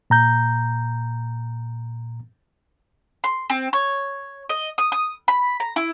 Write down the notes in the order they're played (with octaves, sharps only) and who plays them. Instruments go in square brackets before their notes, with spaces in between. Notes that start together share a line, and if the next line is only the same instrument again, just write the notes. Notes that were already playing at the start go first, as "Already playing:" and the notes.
[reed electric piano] A#2 A#5 G6
[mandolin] C6
C4
C#5
D#5
D#6
D#6
B5
A#5
E4